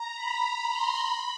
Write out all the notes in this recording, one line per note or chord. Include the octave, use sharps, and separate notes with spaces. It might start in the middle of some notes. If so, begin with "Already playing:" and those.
Already playing: A#5
B5
C6
B5